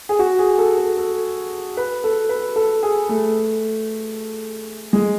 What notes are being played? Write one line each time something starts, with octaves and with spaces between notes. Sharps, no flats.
G#4
F#4
G#4
A4
A4
A4
B4
A4
B4
A4
G#4
A3
G#3